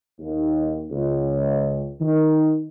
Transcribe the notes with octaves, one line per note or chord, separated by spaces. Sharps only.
D#2
C#2
D#3